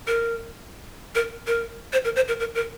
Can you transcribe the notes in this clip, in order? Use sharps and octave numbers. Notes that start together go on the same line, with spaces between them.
A#4
A#4
A#4
C5
A#4
C5
A#4
A#4
A#4